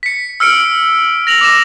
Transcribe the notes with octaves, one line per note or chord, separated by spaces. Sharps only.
B6 C#7
E6 F6 C#7 D7
A#6 F7 F#7
D6 A#6 E7